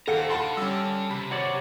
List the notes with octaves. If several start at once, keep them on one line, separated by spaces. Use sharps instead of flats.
D#2 A4 C5 F5 F#5 A#5 C#7
A4 D5 F5 F#5 A5 B5 C6
G3 C#4 E6
C3 B5
F#4 C#5 D5